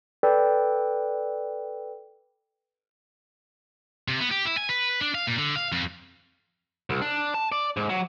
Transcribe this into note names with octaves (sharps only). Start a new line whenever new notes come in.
A4 B4 D5 G5
C3
B3
G4
E4
G#5
B4
D4
F5
A#2
D3
F5
F2
C2
D4
A5
D5
G#2
F#3